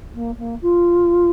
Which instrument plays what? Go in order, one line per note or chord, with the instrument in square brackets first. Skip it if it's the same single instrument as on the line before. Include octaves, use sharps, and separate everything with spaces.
[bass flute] A#3
A#3
F4